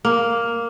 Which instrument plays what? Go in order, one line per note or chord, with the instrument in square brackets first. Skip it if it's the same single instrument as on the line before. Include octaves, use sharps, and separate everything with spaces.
[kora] A#3